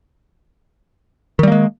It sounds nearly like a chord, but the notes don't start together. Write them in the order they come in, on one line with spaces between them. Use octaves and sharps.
D#3 G3 A#3 G#3